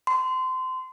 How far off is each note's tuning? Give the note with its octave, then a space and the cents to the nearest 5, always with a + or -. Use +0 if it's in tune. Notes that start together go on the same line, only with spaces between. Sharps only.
C6 -25